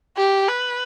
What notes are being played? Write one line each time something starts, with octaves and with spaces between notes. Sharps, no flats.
G4
B4